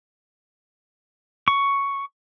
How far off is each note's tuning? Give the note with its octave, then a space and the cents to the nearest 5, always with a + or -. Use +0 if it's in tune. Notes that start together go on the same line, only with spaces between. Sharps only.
C#6 +5